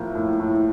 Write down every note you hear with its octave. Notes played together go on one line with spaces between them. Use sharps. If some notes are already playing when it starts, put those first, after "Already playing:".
Already playing: A2 F3 A#3
A2
A2